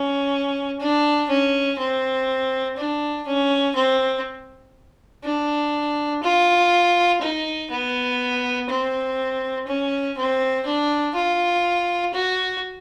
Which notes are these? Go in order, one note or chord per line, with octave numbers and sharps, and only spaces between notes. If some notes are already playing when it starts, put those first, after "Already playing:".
Already playing: C#4
D4
C#4
C4
D4
C#4
C4
D4
F4
D#4
B3
C4
C#4
C4
D4
F4
F#4